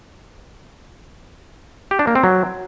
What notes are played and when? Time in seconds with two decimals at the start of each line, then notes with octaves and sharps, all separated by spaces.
1.91 G4
1.99 D4
2.07 A#3
2.15 C4
2.24 F#3